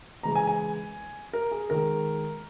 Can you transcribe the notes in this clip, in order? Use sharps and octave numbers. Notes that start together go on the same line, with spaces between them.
C#3 E3 G#3 A#5
G#5
G#5
A#4
G#4
D#3 G#3 A#4